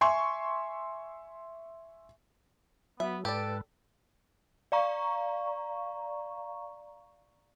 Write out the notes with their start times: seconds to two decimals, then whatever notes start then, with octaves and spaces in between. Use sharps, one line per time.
0.01 E5 G#5 C6 C#6
3.00 F#3 B3 E5
3.25 G#2 G4 A4 B4 D5
4.72 D5 F5 A#5 C#6